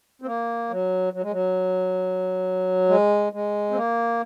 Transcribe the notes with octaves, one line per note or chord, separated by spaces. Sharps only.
C4
A#3
F#3
F#3
G#3
F#3
G#3
G#3
C4
A#3